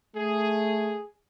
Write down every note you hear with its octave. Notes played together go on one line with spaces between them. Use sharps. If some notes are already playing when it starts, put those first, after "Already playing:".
A3 G#4